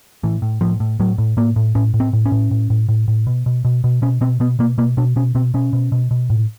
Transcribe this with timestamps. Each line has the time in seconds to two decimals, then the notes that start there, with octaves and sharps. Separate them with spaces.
0.23 A2 E3
0.42 A2
0.61 A2 F3
0.80 A2
1.00 A2 F#3
1.18 A2
1.37 A2 A#3
1.56 A2
1.75 A2 C#4
1.94 A2
2.00 C4
2.13 A2
2.26 C#4
2.32 A2
2.51 A2
2.70 A2
2.89 A2
3.08 A2
3.27 B2
3.46 B2
3.65 B2
3.84 B2
4.02 B2 C#4
4.21 B2 C4
4.40 B2 B3
4.59 B2 A#3
4.78 B2 A#3
4.97 B2 D4
5.16 B2 C#4
5.35 B2 C4
5.54 B2 C#4
5.73 B2
5.92 B2
6.11 B2
6.30 A2